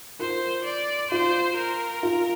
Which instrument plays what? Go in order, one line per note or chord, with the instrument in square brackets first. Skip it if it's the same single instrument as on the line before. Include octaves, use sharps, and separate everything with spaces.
[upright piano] F4 A#4 [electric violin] C5
[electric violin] D5
[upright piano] F4 [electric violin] C5
[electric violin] A#4
[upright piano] F4